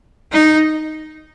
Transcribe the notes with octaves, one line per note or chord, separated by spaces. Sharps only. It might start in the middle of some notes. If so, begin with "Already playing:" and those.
D#4